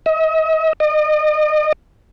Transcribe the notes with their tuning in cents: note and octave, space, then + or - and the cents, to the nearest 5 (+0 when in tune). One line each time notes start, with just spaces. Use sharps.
D#5 +40
D#5 -35